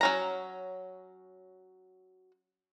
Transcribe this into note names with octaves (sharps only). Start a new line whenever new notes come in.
F#3 C#4 A#5